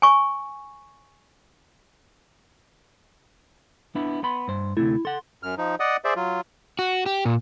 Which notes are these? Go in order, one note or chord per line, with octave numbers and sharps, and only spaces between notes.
G#5 C#6
B3 D4 E4
B3 B5 C6
G2 C5
D2 C3 A3 E4
A4 F#5 C6
F#2 F6
F3 D#4
D5 D#5 F#5 D#6
G#4 C5 D5 E5
F#3 F4
F#4
G4
A#2